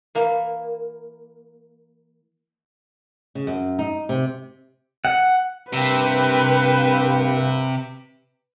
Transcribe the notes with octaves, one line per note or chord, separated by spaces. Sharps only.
E3 A#3
C#3
F#2
D#4
C3
F#5
G2 C3 A#3 G4 B4